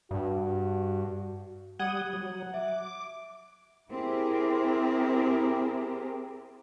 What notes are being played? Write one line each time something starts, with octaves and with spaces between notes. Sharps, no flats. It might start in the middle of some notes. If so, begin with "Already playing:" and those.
G2 F#4
G3 F#5 D#6 G#6
F#3
E5 D6
C4 E4 G4 G#4 A#4